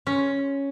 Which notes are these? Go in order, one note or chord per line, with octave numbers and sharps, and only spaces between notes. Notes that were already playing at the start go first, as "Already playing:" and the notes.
C#4